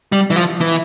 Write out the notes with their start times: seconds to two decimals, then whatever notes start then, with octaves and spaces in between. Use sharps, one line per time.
0.12 G3
0.30 E3
0.36 F3
0.61 E3